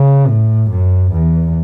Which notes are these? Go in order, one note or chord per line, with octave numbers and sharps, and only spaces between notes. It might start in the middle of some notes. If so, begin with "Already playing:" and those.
Already playing: C#3
A2
F#2
E2